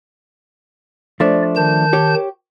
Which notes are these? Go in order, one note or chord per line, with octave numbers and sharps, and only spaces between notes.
F3 A3 D4 D5
D#3 A5 G6
G4 C#5